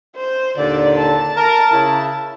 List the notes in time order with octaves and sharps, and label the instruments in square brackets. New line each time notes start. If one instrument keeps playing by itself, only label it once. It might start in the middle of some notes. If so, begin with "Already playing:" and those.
[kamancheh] C5
[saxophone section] D#2 A#2 D3 [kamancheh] D5
[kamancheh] A5
[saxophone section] A#4
C#3 E4